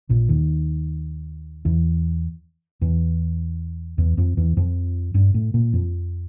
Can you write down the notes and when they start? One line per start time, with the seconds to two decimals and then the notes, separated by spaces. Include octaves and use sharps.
0.09 A#1 A#2
0.29 D#2 D#3
1.65 E2 E3
2.81 E2 E3
3.98 E2 E3
4.17 F2 F3
4.37 E2 E3
4.57 F2 F3
5.14 G2 G3
5.34 A2 A3
5.54 A#2 A#3
5.73 F2 F3